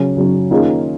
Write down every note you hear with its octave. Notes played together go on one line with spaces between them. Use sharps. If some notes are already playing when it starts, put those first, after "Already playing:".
Already playing: C#3 F#3 C#4
C#3 F#3 C#4
D#3 A#3 C#4 F4 G#4